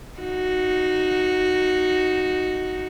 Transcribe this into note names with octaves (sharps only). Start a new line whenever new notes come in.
D#4 F#4